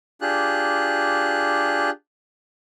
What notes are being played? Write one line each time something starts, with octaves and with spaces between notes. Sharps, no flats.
D4 F4 G4 G#4 F#6